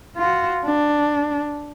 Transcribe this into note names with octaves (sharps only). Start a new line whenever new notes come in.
F4 F#4
D4